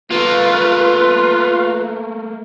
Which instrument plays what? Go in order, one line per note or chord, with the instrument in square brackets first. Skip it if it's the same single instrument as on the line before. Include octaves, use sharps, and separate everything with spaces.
[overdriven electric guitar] A3 A#3 [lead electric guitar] F4 [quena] B4